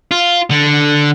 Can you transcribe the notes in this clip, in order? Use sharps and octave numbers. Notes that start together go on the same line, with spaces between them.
F4
D3